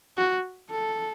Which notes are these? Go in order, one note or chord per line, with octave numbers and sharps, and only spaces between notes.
F#4
A4